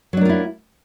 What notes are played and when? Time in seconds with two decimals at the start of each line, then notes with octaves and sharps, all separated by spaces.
0.13 F#3
0.17 D4
0.21 A#3
0.25 F4
0.29 E4